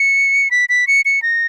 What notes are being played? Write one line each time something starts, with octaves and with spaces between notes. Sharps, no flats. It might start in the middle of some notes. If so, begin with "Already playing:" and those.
Already playing: C#7
B6
B6
C#7
C#7
A#6